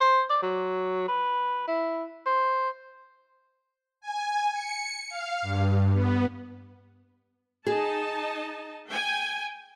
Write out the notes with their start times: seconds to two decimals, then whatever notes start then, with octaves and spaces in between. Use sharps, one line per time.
0.01 C5
0.30 D5
0.43 F#3
1.08 B4
1.68 E4
2.26 C5
4.01 G#5
4.53 C#7
5.09 F5
5.42 G2
5.93 B3
7.67 D#4 G#4 D#5 A5
8.89 G5 G#5